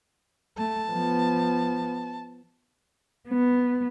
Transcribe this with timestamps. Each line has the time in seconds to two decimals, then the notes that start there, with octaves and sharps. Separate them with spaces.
0.57 A3 A5
0.91 F3 B3
3.28 B3